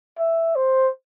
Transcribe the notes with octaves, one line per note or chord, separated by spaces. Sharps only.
E5
C5